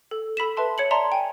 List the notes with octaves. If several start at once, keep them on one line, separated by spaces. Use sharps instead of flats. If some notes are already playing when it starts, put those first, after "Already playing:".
A4
A4 B5 B6 E7
B4 E5 A5 C6
C#5 C#7 F#7
D5 E5 A5 A#5 C6
G5 G#5